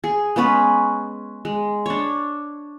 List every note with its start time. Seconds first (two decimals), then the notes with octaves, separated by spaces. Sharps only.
0.04 G#4
0.36 G#3 B3 C#4 B4
1.45 G#3
1.86 D4 C#5